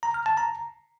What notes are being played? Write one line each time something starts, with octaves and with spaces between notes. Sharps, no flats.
A#5
F6
A5
A#5